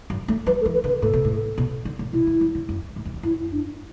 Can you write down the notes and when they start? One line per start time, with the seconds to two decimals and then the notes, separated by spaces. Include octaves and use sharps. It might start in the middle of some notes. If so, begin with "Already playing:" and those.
0.10 F#2
0.28 A3
0.47 F#3 B4
0.61 A4
0.66 E3
0.74 B4
0.84 D3
0.88 B4
1.02 A2 A4
1.13 B2
1.25 A2
1.58 B2
1.85 D3
1.99 A2
2.13 B2 E4
2.27 D3
2.41 F#3
2.55 D3
2.69 F#2
2.96 A2
3.05 F#2
3.14 E2
3.23 F#2 E4
3.52 D4